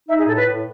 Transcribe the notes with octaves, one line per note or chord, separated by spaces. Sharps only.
D#4 E5
G#4
A2 A4
B4
A2